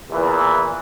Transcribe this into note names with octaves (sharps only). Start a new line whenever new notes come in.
E2 A#2 E3